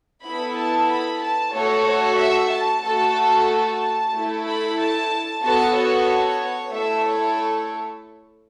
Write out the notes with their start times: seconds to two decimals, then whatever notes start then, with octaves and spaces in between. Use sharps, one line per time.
0.24 B3 E4 A4 B5
0.56 A5
0.88 B5
1.21 A5
1.54 A3 F#4 A4 C#5
1.85 C#5
2.18 E5
2.51 A5
2.83 A3 F#4 A4 A5
3.48 A5
4.12 A3 E4 A4
4.44 B5
4.77 A5
5.41 B3 F#4 A4 A5
5.74 C#5
6.70 A3 E4 A4 E5
7.04 C#5